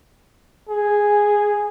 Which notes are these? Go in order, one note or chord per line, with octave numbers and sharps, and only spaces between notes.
G#4